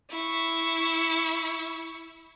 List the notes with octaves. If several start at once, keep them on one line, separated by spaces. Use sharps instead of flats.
E4 C#6